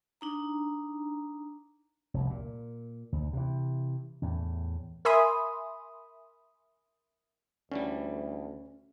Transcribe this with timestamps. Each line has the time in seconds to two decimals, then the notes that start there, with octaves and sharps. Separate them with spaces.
0.21 D4 D#4 A#5
2.14 F1 C2
2.30 A#2
3.12 D2
3.33 C3 E3
4.22 E2 A2
5.05 A#4 E5 G#5 B5 C6 D#6
7.72 D2 D3 E3 G3 C#4